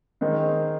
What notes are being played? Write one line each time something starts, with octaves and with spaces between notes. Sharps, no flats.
D#3 G#3 C4 D#4